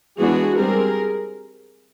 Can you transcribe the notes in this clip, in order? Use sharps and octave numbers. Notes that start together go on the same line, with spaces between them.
E3 G#3 B3 D4 F#4 G#4
G3 C4 G#4 A#4